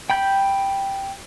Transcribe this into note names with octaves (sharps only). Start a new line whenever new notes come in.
G5 B5 G6